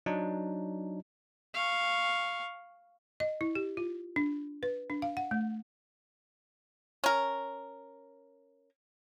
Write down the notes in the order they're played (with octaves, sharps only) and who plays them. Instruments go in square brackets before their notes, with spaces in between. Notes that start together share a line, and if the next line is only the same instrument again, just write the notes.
[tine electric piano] F#3 D4 D#4
[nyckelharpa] F5 C#6
[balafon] D#5
E4
G4
F4
D4
B4
D4
F5
F#5
A3
[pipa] C#4 A#4